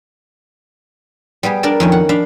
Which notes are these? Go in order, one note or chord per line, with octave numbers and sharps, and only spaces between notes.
G3 B3 G4 G#4
D4 A#4 D5 A5
F2 D#3 C#4
F#5
D4 F5 B5